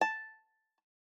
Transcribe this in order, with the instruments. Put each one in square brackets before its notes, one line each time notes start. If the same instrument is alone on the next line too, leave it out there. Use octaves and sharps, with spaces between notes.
[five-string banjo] A5